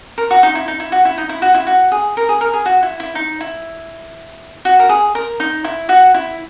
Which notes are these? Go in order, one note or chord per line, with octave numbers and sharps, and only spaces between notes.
A#4
F#4
D#4
E4
D#4
E4
F#4
E4
D#4
E4
F#4
E4
F#4
G#4
A#4
G#4
A#4
G#4
F#4
E4
E4
D#4
E4
F#4
A#4
G#4
A#4
D#4
E4
F#4
E4